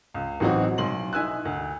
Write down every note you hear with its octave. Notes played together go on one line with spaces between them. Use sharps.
C#2
A1 E3 F#3 C4 D#4 F#4
B1 C6 F#7
D#4 E4 G#5 E6 F#6
D2